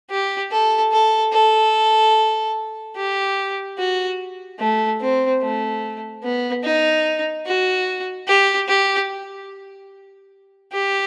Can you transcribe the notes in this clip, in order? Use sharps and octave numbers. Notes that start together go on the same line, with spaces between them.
G4
A4
A4
A4
G4
F#4
A3
C4
A3
B3
D#4
F#4
G4
G4
G4